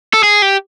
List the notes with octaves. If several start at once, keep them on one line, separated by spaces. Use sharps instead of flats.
A4
G#4
G4